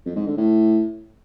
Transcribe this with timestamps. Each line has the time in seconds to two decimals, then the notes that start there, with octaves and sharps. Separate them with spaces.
0.05 F2
0.16 G#2
0.27 D3
0.37 A2